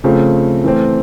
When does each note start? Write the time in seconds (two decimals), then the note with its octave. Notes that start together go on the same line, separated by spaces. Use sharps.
0.04 C#3 F3 A3 C4
0.64 E3 A3 C4